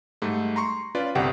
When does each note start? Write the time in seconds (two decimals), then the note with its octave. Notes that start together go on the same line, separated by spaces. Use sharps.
0.22 G#2 G3 A3
0.56 A#5 C6 C#6
0.95 C#4 F4 B4 D5
1.15 G1 C2 G4 F#5 G5